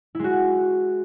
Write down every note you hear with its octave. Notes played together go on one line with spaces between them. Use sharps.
G#3 E4 F#4